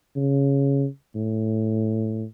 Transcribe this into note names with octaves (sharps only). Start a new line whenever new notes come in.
C#3
A2